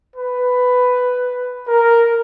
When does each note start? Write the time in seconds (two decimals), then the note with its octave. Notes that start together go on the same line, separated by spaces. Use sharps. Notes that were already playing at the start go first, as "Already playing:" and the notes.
0.16 B4
1.68 A#4